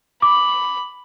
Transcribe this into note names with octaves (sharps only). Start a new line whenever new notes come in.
B5 D6